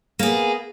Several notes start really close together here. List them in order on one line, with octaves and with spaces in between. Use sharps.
A#3 G#4 B3